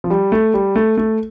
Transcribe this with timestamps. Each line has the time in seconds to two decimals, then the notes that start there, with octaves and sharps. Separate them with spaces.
0.04 F3
0.10 G3
0.32 A3
0.54 G3
0.76 A3
0.97 A3